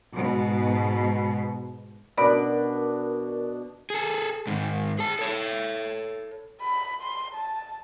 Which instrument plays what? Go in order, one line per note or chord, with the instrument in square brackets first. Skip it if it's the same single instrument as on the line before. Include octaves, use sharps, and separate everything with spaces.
[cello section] G#2 B2
[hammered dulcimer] B2 D4 [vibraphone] A#4 [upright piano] D5 B5 D7
[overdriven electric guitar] G#4 A4
G#2 D#3
G#4 A5
A4 C#5
[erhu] B5
C6
A5